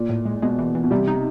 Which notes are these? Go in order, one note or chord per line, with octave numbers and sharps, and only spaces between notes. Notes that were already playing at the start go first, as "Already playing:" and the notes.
Already playing: A#2
A2
G#3
B2 G#3
E3
E3
B2
C3 G3
D#4